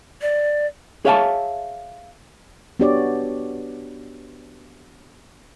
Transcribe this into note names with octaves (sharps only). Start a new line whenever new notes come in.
D5
G#4 C#5 E5 F5 G5 A5
B3 D4 F#4 G4 C#5 D5